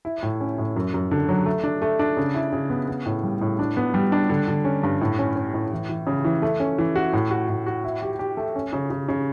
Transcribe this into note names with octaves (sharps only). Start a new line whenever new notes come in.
E4
A2
C#4
A2
F#2
F#2
D3
F#3
A3
D4
A3
D4
C#3
E4
C#3
B3
B3
A2
G3
A2
D4
B3
G3
D4
D3
D3
C#4
G2
A2
C#4
C#4
A2
E3
E3
C#3
E3
A3
C#4
E3
F#4
A2
F#4
A2
F#4
E4
G4
G4
A3
C#4
C#3
C#3
C#3